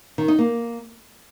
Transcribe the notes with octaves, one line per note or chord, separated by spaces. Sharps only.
D#3
D#4
A#3